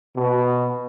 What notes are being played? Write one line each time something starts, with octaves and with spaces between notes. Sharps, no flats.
B2